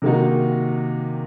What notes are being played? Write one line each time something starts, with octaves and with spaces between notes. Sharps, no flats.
C3 D#3 A#3 D#4 F#4